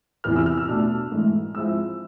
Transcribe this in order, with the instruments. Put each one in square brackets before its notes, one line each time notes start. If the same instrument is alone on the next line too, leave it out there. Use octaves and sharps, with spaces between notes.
[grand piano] E2 C3 E3 F6
E6
F6
E6
B2 A3 D4
G#2 E3 A3
G#2 F3 G#3 C4 E4 E6